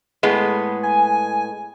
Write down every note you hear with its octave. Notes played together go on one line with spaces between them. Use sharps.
A2 G#3 B3
G#5